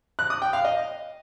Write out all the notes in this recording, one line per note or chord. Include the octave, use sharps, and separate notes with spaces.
F#6
D#6
G5
F5
D#5